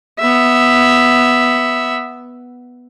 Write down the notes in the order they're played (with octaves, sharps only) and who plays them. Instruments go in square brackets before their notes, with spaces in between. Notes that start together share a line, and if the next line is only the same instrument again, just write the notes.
[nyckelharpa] B3 E5